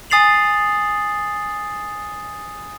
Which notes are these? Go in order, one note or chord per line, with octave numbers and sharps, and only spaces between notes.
G#5 D#6 A6 C7 F7 F#7